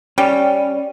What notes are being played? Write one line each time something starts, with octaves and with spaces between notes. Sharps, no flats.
G3 C#4